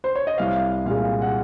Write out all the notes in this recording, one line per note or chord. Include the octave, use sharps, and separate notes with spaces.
C5
C#5
D#5
C2 F5
A#2 G#3 F5
F#5